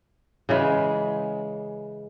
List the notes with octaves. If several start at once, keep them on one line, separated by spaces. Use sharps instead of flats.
C#3 E3 G#3